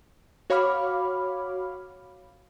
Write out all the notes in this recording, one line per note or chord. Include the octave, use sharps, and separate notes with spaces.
F#4 C#5 F5 B5 D6 F6